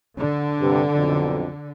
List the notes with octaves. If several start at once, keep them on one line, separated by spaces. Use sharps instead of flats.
D3
G2 C3
B1 F2 D#4